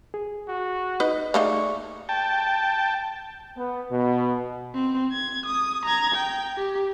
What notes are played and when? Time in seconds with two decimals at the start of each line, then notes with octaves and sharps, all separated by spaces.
0.14 G#4
0.48 F#4
1.00 D#4 B4 D#5
1.34 A3 A#3 D#4 G#4 D5 C#6
2.09 G5 A5
3.57 B3
3.91 B2
4.74 C4
5.12 G#6
5.46 D#6
5.85 A#5 G#6
6.14 G5
6.57 G4